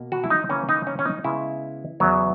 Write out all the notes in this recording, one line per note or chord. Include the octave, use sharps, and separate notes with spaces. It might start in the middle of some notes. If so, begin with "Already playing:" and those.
Already playing: B2 A#3
F#4
E4
D#4
C#3 E3 A#3 C#4
D#4
C#4
C#4
D#4
C#3 G#3 B3 E4
E2 C#3 F#3 B3